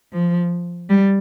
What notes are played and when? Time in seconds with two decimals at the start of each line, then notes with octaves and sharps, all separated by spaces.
0.13 F3
0.90 G3